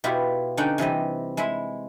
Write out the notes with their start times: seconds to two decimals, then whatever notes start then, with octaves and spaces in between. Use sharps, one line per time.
0.04 B2 B3 E4 F4 G4
0.57 D3 C#4 D#4 F#5 G5
0.78 C3 E3 G3 D#5
1.37 G#3 E4 E5